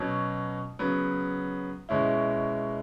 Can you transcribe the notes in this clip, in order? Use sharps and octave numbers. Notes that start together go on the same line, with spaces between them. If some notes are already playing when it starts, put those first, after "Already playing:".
Already playing: B2 F#3 C#4
C#3 F#3 B3
B2 G#3 C#4 E4